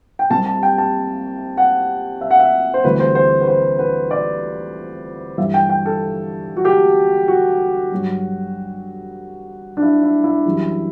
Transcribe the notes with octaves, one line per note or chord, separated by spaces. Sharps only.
G5
C2 C3 G3 A5
A5
G5
A5
F#5
E5
F#5
E5
C5
D2 C3 E3 G3 B4
C5
C5
B4
C5
B4
D5
G2 E3 G3 E5
G5
G5
A4
F#4
G4
F#4
G2 F#3
D4
E4
E4
E4
F#2 E3 G3